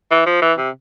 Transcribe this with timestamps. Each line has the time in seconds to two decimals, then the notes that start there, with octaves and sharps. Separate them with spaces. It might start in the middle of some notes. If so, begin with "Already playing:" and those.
0.11 E3
0.26 F3
0.42 E3
0.58 C3